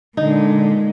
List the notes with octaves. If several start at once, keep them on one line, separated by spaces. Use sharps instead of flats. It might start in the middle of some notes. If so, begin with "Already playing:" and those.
A#2 D3 G#3 D#4